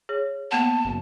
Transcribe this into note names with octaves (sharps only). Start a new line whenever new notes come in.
G#4 C#5
A#3 B3 F#5 A5
F#1